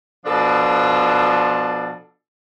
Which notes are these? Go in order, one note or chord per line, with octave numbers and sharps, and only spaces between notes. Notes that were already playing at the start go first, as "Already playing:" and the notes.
B2 F3 D4 F4 A4